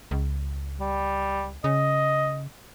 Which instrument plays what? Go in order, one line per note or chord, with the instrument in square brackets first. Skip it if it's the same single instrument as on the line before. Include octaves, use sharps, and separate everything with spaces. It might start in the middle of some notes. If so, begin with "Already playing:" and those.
[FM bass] C#2
[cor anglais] G3
[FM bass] C#3 [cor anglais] D#5